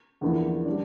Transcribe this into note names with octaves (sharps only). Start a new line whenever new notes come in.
E2 D3 F3 A#3 E4
G3 D4